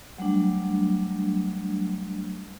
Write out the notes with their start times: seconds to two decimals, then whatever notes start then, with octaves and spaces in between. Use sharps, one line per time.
0.18 F#3 G3 A3 D4